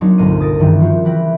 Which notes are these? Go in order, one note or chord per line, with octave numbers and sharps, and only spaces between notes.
F#3 A#3 C4 D4 D#4 F#4
G1 C2 A#2 F4 A#4 D#7
D#6 A6 A#6 D7 D#7
C#2 G2 D#3 E3 F4 G5
F3 F4 F#4
E3 E4 B4 G5 A#6